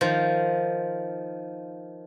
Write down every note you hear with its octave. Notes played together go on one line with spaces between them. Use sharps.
D#3 F3